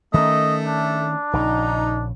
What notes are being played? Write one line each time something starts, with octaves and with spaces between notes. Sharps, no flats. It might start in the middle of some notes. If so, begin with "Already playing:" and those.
D#3 A3 C#4 D#5
D4
A#1 C#3 D#4